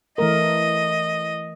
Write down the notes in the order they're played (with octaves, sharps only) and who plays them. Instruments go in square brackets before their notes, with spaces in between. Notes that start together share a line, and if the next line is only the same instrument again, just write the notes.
[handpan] E3 A3 A#4 [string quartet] D#5